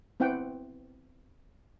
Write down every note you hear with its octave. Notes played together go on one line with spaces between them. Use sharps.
B3 C4 E4 F#5 G5